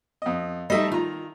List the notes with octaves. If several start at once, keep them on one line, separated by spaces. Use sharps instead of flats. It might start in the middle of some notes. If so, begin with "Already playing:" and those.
F2 D#5
G3 A3 D#4 D#5 E5 A5
D#3 F4 A#5